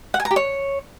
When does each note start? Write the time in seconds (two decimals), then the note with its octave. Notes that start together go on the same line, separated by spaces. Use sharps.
0.14 F#5
0.20 G#5
0.25 A#5
0.31 G4
0.36 C#5